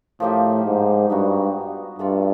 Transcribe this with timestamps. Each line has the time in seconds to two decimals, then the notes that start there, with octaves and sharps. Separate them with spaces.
0.20 A2 F3 A#3 D#4 G4
0.65 G#2
1.09 G2 B3 D#4 F#4
1.99 G2 A3 D4 F4 A4